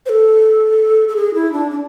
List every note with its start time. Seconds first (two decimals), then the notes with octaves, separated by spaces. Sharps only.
0.06 C5
0.09 A4
1.08 A4
1.16 G#4
1.34 E4
1.52 D4
1.70 D4